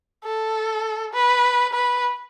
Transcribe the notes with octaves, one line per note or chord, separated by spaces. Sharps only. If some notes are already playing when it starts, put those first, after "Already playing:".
A4
B4
B4